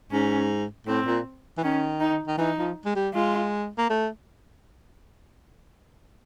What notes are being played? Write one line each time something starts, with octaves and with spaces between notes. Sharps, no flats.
G#2 C#4
A2 C4
A#2
E3
D#3 C#4
D#4
D#3
E3 D#4
F3
G#3
G3
G#3 F4
A#3
A3